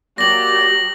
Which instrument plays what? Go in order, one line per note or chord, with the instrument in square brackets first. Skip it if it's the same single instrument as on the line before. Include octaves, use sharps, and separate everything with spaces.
[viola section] F#3 G4 [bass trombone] A#3 [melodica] D5 [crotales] A#6 F#7